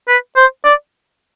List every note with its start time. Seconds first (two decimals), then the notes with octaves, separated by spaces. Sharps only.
0.08 B4
0.36 C5
0.65 D5